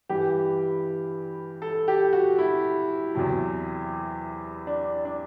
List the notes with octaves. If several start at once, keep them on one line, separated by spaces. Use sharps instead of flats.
G2 E3 G4
A4
G4
F#4
E4
E2 C3 F#3
D4
D4